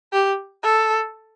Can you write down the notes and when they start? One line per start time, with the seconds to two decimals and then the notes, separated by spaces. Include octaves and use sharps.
0.13 G4
0.63 A4